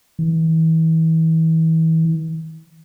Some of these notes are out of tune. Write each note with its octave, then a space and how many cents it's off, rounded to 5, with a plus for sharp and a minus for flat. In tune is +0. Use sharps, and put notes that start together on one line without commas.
E3 -35